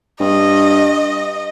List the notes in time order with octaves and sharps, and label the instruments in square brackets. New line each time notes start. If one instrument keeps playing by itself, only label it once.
[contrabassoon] G2 [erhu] D#5